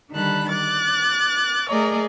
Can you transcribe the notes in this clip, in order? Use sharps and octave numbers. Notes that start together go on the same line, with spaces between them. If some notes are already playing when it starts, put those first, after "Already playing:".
D3 D#3 G3 A5 B5 F#6
D6 F#6 A6
A3 G#4 A#4 D5 D#5